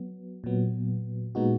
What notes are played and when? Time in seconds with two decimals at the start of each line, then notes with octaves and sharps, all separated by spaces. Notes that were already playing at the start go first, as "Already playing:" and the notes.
Already playing: F#3 B3
0.44 A#2 F#3 B3
1.35 A#2 G#3 B3 D#4 F#4